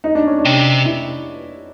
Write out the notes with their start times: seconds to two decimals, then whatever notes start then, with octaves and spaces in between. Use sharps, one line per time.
0.04 D#4
0.15 D4
0.26 C#4
0.39 D4
0.45 C3
0.85 E4